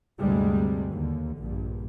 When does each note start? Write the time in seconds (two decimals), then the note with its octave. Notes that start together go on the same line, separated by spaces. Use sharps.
0.18 D2 G2 C3 G3 G#3
0.91 D#2 D3
1.39 A#1 G2